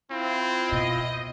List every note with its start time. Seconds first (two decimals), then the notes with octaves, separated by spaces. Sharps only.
0.11 C4 E4 F4
0.72 B2 D#5